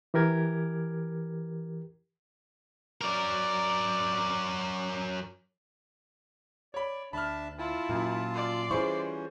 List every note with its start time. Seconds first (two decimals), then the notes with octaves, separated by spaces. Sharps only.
0.14 E3 G4 A#4 G#6
3.01 F#3 A#4 D5
6.74 C#5 D5 B5
7.13 D2 D4 E5 A5 B5 F6
7.59 E4 F4 A5
7.89 F#2 A#2
8.33 D5 C6
8.71 E3 G3 C#4 E4 F4 G#4 C5 C#6